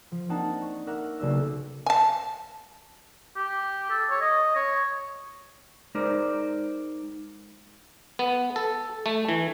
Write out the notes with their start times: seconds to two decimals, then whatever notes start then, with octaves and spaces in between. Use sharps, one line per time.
0.12 F3
0.29 A#3 C4 D4 D#4 F#5 A5
0.62 C#6
0.87 A#4 E5 F#5 D6 F#6
1.20 B1 C#3 A#3 D5 E5 E6
1.86 G#5 A5
3.36 G4
3.90 A4
4.10 C#5
4.21 D#5
4.56 C#5
5.95 G#3 D#4 A#4 C5 D5
8.19 B3
8.56 A4
9.06 A3
9.29 E3